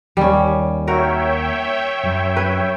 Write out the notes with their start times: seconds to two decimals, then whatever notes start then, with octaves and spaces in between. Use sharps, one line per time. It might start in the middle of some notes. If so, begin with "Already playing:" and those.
0.17 D#2 G3 C#4
0.88 F#4 A#4 C#5 E5 G5
2.04 F#2
2.37 B4